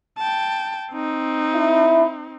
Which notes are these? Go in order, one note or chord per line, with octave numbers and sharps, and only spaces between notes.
G5 A5
C4 D#4
E4